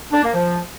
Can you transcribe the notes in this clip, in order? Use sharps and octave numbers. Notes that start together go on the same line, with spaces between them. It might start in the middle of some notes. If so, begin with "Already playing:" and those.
D4
A#3
F3